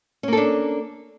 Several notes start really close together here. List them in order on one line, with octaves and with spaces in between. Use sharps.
C#4 A#3 A4 D4